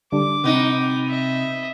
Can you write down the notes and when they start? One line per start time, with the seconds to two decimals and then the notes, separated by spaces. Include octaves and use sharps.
0.12 D3 G3 D4 D6
0.44 C3 B3 D#4
1.09 D#5 E5